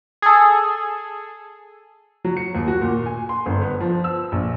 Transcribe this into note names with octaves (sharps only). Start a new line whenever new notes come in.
G#4 A4
F#3
C#7
D#2
F#4
A#2
G#5
C6
G1
B3
F3
E6
A#1